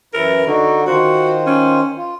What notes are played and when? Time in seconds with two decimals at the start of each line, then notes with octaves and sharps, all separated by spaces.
0.14 F#2 E3 E4 A#4
0.47 D3 D#4 F#4
0.87 D#3 F4 F#4 C5
1.47 C#4
1.97 F4